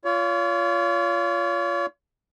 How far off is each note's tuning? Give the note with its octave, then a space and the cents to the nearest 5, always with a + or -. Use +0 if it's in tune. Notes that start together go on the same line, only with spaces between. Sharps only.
F4 -15 C#5 +40